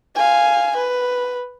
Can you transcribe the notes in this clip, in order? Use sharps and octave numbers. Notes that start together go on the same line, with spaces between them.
F5 G#5
B4